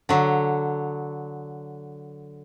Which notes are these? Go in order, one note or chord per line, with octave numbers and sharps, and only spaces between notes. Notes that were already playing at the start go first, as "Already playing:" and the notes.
D3 F#3